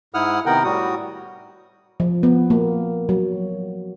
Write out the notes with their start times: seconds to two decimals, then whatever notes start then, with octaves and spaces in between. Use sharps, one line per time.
0.14 G#2 E4 F#5 D#6 F6
0.46 C3 D#3 B3 A#4 F#5 G5
0.64 A2 G3 F#4 D#6
2.00 F3
2.23 B3
2.50 A#3
3.09 F#3